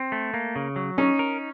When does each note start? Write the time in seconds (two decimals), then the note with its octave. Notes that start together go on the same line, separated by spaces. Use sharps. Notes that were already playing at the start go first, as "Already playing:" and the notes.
Already playing: C4
0.12 A3
0.34 A#3
0.56 C#3
0.76 F#3
0.98 C#4 D#4
1.19 A#4